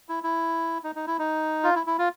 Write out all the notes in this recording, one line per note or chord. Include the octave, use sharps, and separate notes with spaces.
E4
E4
D#4
D#4
E4
D#4
F4
E4
E4
F4